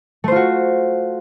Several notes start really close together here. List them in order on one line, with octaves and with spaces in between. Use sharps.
A3 C5 F4 F#4